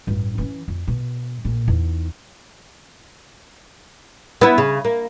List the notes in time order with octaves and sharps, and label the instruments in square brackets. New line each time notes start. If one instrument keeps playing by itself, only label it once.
[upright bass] A1 G2
E3 C#4
F2
B2
A#1 A#2
E2 D#4
[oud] B3 E4
C#3
A#3